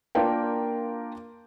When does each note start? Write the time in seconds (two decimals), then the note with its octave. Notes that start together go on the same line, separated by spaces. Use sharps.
0.15 A#3 D4 F4 A#4 G5